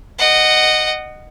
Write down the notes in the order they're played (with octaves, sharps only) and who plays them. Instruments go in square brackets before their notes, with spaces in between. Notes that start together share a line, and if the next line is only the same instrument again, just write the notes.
[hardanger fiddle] D#5 F#5